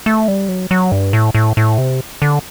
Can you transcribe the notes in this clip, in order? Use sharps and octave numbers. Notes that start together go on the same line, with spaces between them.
A3
G3
F#3
F#3
G2
A2
A2
A2
C3
D3